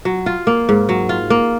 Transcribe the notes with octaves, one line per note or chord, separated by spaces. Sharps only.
F#3
F4
A#3
G#2
F#3
F4
A#3